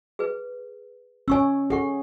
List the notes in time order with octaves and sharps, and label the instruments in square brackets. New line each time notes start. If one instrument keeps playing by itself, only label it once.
[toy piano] G#4 B4
[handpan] C#4 C#5 [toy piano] G#5 C#6 E6
[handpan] G#4 [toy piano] A4 F#5 C#6